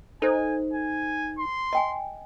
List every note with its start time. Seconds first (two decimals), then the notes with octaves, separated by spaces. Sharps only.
0.22 D#4 A4 C5 G#5
0.73 G#5
1.39 C6
1.73 D#5 G5 G#5